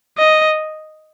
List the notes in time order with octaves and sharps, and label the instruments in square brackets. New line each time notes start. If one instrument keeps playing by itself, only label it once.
[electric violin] D#5